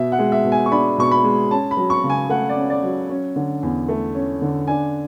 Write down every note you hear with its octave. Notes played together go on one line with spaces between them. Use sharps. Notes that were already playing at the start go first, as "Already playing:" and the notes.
Already playing: B2 E5
F#5
G#3
E5
B2
G#5
C#6
D4 B5
B2 C#6
B5
G#3
C#4 A5
B5
F#3
C#6
C#3
G#5
A3 F#5
D5
C#4
D5
F#3
C#4
D3
E2
A3
C#4
D3
D4 G#5